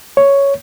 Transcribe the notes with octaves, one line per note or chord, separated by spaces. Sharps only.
C#5